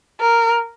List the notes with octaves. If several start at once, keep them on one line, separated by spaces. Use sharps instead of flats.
A#4